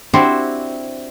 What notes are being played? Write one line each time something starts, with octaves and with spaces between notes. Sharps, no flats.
C4 D4 E4 F#4 G4 C5